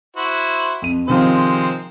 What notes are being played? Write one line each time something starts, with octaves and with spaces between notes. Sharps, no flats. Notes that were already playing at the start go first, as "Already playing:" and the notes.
E4 F#4 C5
F2 D#7
C3 D#3 F3 G#3 C4 C5